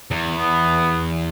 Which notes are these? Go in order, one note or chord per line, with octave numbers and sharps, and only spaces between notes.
E2
B3